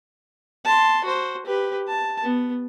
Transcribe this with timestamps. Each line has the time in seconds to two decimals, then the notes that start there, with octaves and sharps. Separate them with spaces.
0.65 A5 C6
1.04 F#4 C5
1.46 G4 B4
1.88 A5
2.23 B3